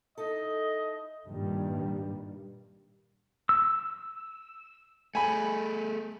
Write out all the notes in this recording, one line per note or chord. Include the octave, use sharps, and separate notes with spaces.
D#4 E4 A4 D#5
G2 A#2 D#3 G3
E6
A3 G#4 G#5 B5